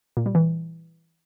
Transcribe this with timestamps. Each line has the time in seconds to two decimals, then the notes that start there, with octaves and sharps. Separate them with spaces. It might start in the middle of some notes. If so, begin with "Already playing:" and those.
0.17 A#2
0.26 G3
0.35 E3